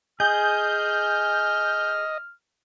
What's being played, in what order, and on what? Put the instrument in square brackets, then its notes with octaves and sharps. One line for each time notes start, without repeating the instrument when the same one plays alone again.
[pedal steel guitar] G#4 [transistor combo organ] D#5 [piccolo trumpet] F6 [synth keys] G6